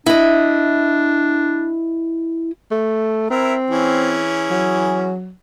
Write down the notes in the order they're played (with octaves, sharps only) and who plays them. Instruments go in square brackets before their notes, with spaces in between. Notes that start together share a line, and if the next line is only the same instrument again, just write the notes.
[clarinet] D4 [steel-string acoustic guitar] E4 D#5
[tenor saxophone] A3
[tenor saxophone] C4 [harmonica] E4 A#4 E5
[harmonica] E3 C#4 G#4
[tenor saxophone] F#3